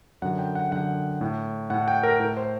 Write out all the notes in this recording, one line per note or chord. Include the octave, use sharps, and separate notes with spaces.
F#2 D3 F#5
G5
F#5
F#2 D3 F#5
A2
A2 F#5
G5
A#4
A2 A#4
C5